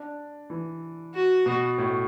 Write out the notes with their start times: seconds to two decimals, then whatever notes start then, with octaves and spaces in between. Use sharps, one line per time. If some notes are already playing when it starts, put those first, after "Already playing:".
Already playing: D4
0.50 E3
1.14 F#4
1.46 B2
1.78 A2